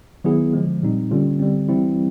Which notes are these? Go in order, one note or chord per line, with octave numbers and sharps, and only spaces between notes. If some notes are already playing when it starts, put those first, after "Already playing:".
D#3 F#3 B3 E4 G#4
D3 F3 G#3
A#2 G3 C4 D#4
D3 G3 A#3 C#4 F4
D3 G3 C4
E3 G3 C4 E4